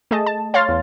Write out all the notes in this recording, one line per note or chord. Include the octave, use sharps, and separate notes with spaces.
A3 G#4 D#5 A5
A5
C#5 F5 C6 F6 A6
E2